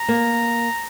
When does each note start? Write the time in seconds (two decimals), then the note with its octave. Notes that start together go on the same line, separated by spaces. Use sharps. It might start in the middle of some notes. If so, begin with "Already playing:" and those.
Already playing: A#5
0.08 A#3